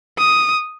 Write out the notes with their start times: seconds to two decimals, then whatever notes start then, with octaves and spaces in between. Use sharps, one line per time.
0.18 D#6